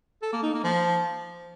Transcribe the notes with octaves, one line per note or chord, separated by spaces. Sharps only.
A4
A#3
D#4
A#3
F3